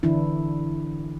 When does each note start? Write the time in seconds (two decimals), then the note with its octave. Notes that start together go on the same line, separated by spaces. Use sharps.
0.03 D3 E3 D4 E4